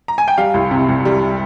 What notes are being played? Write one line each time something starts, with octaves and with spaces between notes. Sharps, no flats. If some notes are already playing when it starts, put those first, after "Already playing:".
A#5
G#5
G5
G3 F5
C2
C3
C2
G3